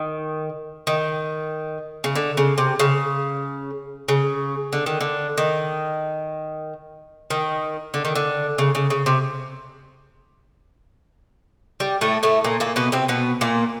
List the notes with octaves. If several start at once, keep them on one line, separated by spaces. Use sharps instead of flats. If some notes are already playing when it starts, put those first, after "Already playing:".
Already playing: D#3
D#3
C#3
D3
C#3
C3
C#3
C#3
D3
D#3
D3
D#3
D#3
D3
D#3
D3
C#3
C#3
C#3
C3
G3
A2 A3
A2 A3
A#2 A#3
A#2 A#3
B2 B3
C3 C4
B2 B3
A#2 A#3